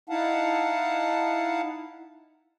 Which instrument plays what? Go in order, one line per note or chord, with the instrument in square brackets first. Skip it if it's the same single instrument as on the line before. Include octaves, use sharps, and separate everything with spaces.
[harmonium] D#4 E4 F5 F#5 A5